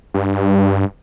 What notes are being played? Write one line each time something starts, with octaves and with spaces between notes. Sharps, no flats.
G2